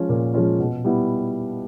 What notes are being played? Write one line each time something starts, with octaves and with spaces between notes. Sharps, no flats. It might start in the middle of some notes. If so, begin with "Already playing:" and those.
Already playing: F3 G#3 C#4 F4
A#2
F3 G#3 C#4 F4
B2
G3 B3 E4